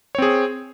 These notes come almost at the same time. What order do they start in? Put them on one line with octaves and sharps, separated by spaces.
C#5 C4 G#4